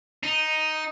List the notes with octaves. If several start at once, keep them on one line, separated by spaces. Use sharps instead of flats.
D#4